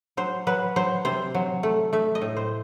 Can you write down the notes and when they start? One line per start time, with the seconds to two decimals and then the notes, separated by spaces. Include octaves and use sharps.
0.17 F#3 C5
0.47 F#3 B4
0.76 F#3 C5
1.05 C3 C5
1.35 F#3
1.63 A3
1.93 A3 E5
2.15 D#5
2.21 A2
2.37 C5